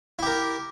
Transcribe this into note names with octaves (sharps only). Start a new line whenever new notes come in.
E4 G4 A#4